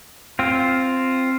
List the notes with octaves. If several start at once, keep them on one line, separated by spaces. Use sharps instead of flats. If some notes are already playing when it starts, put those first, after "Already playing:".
C4 F4